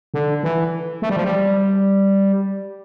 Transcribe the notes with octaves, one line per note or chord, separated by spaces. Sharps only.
D3
E3
A3
G3
F3
G3